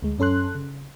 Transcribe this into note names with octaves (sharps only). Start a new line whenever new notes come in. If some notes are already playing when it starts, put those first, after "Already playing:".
D2 G#3
F#2 C#4 A4 C6 F#6
C#3